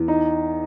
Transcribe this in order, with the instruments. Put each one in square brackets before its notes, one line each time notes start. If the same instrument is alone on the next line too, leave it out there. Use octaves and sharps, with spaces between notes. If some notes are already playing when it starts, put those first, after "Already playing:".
Already playing: [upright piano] E2
D#4